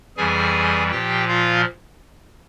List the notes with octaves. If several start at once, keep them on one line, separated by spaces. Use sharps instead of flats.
F2 E3 G3 G#4 G#5
A#2 F3 G4 G5
F4 F5